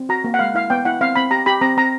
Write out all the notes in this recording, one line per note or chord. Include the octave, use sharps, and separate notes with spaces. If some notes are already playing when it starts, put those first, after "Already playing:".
Already playing: C4
F#4 A#5
A#3
F#5
G#3 F5
E4 F5
B3 G5
E4 F#5
C4 F5
C4 B5
G4 A#5
G4 B5
C4 A#5
C4 A#5